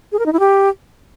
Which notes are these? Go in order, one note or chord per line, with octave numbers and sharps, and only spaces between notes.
G#4
A#4
D#4
E4
G4